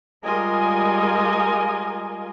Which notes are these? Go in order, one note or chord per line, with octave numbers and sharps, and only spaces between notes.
G3 G#3 F4 A#4 D#5 G#5